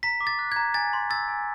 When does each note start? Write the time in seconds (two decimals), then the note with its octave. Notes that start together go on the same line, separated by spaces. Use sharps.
0.03 A#5 B6
0.21 D6
0.27 A6
0.39 F#6
0.52 A#5 G#6
0.74 G#5 A6
0.93 C6
1.10 E6 A6
1.28 G#5